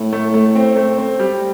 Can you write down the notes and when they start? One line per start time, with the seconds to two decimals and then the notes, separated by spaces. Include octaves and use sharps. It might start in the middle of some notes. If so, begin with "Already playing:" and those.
Already playing: A2
0.13 A3
0.34 A3
0.55 C4
0.76 A3
0.98 C4
1.20 G3